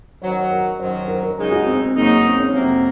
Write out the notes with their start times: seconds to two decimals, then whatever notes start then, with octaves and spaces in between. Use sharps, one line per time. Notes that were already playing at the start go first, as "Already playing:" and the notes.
0.21 F#2 D#3 F#3 C5
0.51 A#4
0.80 F#2 D#3 F#3 C5
0.95 C5
1.08 A#4
1.23 A#4
1.37 F#2 C#3 G#3 D#4 G#4
1.52 F#4
1.66 C4
1.81 C4
1.96 F#2 C#3 G#3 A#3 D#4
2.25 C4
2.40 C#4
2.54 F2 C3 F#3 A#3 C4